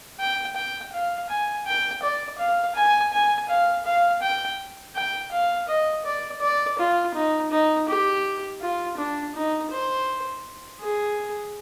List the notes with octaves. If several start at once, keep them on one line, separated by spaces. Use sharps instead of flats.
G5
G5
F5
G#5
G5
D5
F5
G#5
G#5
F5
F5
G5
G5
F5
D#5
D5
D5
F4
D#4
D#4
G4
F4
D4
D#4
C5
G#4